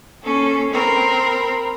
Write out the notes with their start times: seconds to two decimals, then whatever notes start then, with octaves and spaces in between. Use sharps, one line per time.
0.22 A#3 C#4 A4
0.71 C4 A#4 B5